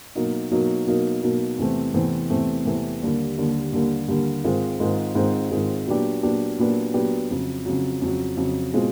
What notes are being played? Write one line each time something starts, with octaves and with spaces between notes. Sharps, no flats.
B2 F#3 A#3 D#4
B2 F#3 A#3 D#4
B2 F#3 A#3 D#4
B2 F#3 A#3 D#4
E2 C3 E3 A3 C4
E2 C3 E3 A3 C4
E2 C3 E3 A3 C4
E2 C3 E3 A3 C4
D#2 D3 G3 A#3
D#2 D3 G3 A#3
D#2 D3 G3 A#3
D#2 D3 G3 A#3
G#2 D#3 G#3 C4 F4
G#2 D#3 G#3 C4 F4
G#2 D#3 G#3 C4 F4
G#2 D#3 G#3 C4 F4
A#2 F#3 B3 D4 G4
A#2 F#3 B3 D4 G4
A#2 F#3 B3 D4 G4
A#2 F#3 B3 D4 G4
F2 C#3 F#3
F2 C#3 F#3
F2 C#3 F#3
F2 C#3 F#3
B2 G#3 C4 F4